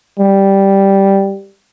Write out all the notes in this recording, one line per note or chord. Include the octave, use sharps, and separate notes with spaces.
G3